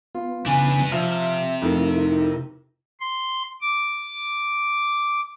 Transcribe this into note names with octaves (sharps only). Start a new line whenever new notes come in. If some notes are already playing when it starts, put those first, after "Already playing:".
B3 F4
C#3 E3 B3 D4 B4 G#5
C3 F3 E5 F6
F2 A3 D#4 E4 A#4
C6
D6